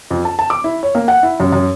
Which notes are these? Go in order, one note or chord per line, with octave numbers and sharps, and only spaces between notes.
F2
A5
A5
D6
E4
C#5
A#3
F#5
E4
F#2
F#2